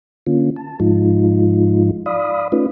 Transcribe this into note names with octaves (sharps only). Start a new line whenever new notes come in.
D3 A#3 C#4 F4
A5
G#2 F3 G#3 D#4 F4
D5 F5 B5 D#6
A3 C#4 D#4 F4 B4